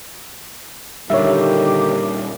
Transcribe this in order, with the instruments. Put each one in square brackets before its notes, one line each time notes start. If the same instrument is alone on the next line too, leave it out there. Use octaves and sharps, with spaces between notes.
[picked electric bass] A#2 G3 [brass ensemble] D3 D#3 G4 [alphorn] A#3 [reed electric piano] C#5 E5